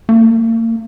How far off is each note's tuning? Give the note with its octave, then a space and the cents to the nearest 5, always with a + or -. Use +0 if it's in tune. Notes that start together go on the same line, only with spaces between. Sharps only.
A#3 -40